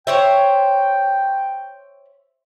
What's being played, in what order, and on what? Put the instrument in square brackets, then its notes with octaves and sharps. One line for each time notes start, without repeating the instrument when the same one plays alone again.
[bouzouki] C5 C#5 E5 [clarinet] G5